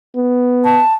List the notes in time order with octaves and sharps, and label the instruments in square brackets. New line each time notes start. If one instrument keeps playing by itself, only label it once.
[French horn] B3
[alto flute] A5